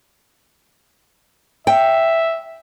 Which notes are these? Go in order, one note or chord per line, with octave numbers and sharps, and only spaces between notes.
E5 G5